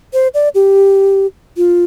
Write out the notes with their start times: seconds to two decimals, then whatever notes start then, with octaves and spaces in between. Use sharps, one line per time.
0.13 C5
0.34 D5
0.55 G4
1.57 F4